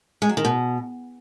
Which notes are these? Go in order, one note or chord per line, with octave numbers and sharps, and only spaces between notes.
G#3
F#3
D#3
B2